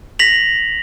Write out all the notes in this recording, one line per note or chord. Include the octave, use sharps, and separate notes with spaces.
A#6 B6 F7 F#7